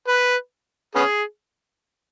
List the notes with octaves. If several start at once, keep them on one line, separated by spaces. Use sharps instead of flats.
B4
B3 C#4 G#4